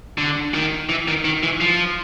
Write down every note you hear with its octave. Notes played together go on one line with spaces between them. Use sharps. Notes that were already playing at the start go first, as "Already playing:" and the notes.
D3
D#3
E3
D#3
D#3
E3
F3